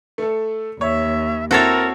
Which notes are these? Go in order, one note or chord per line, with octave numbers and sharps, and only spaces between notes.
A3 A4
D#2 C#5 E5
C4 E4 F#4 A4 A#4 C#5 A6